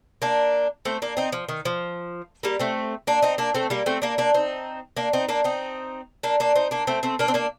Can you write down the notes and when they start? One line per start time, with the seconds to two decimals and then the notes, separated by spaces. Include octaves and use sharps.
0.22 A#3 D4
0.85 A3 C4
1.02 A#3 D4
1.17 C4 D#4
1.32 F3
1.49 D#3
1.65 F3
2.43 G3 A#3
2.60 A3 C4
3.07 A#3 D4
3.23 C4 D#4
3.38 A#3 D4
3.54 A3 C4
3.70 G3 A#3
3.86 A3 C4
4.02 A#3 D4
4.18 A#3 D4
4.34 C4 D#4
4.97 A#3 D4
5.13 C4 D#4
5.29 A#3 D4
5.44 C4 D#4
6.23 A#3 D4
6.40 A#3 D4
6.56 C4 D#4
6.71 A#3 D4
6.87 A3 C4
7.03 A3 C4
7.19 A#3 D4
7.28 C4
7.34 A#3 D4